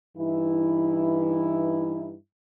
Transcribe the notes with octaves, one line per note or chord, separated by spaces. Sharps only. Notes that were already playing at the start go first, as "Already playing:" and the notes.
G2 E3 D#4 E4